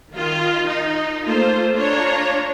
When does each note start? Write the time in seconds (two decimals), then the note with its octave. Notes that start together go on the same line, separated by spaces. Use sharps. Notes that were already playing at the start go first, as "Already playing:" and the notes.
0.13 D#3 F4
0.66 D#4
1.24 A3 A#3 F4 A4 C5
1.74 D4 F4 C#5 A#5